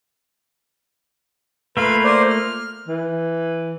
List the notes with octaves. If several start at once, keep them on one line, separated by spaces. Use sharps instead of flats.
A3 A#3 F4 B4 B5
C5 D5 C6
F6
E3